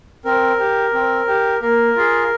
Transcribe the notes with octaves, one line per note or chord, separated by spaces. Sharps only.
C4 A#4
G4
C4
G4
A#3 A#4
F4 G#4